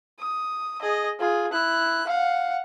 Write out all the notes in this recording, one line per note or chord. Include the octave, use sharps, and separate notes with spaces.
D#6
G#4 D#5
F4 G#4
E4 F#6
F5 F#5